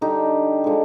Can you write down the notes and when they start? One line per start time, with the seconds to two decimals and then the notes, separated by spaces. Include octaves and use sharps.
0.01 D3 G3 D#4 G4
0.64 D3 F3 G#3